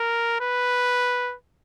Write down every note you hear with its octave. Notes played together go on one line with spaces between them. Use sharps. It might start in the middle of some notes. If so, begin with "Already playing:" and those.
Already playing: A#4
B4